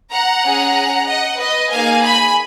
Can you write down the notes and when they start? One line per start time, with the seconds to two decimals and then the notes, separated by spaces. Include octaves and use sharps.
0.11 F#5 A#5
0.44 C#4 G#4
1.07 D#5 F#5
1.39 B4 D#5
1.70 A#3 D#4 G#4 F5 G#5
2.02 G#5 B5